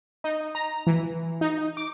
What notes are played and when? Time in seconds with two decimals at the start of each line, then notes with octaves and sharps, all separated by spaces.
0.24 D#4
0.55 A#5
0.87 E3
1.41 D#4
1.77 D6